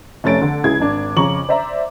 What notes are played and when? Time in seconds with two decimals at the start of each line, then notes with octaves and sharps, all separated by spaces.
0.24 F1 A3 C#4 A6 D7
0.41 D3
0.64 C#2 E4 G#4 G#6
0.79 G#1 D4
1.17 F2 C#3 A#5 C#6 D6 F#7
1.49 C5 D5 E5 A#5